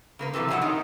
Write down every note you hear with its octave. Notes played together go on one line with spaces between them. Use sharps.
C#3 A#3 B4
C3 E3 F3 A3
F2 B2 D#3 F#3 D#4 F#5
D#4 A#4 D#5